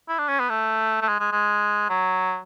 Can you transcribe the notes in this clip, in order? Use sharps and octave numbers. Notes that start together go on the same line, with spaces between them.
E4
D4
C#4
B3
A3
A3
G#3
G#3
G#3
F#3